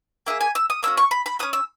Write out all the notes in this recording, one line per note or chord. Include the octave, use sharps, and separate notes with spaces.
A#3 E4 G#4 E5
G#5
E6
D#6
A#3 C#4 F#4 E6
C#6
B5
B5
C#4 F#4 D#6
E6